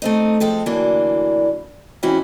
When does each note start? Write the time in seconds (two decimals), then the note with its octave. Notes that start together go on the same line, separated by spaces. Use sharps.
0.02 A3 C4 D#4
0.40 F3 G#3 C4 A4
0.66 D2 D3 E3 F#3 A#3 D4
2.03 G#2 E3 C4 C#4 E4 F#4